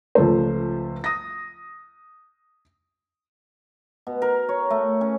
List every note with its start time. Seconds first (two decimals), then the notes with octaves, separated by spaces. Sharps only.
0.15 C#2 F3 A3 C5
1.04 D#6 A#6
4.07 B2
4.22 A#4
4.49 C#5
4.70 A3
5.01 C#4